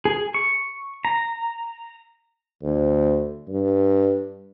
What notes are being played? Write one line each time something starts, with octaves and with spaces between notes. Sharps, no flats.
G#4
C#6
A#5
D2
G2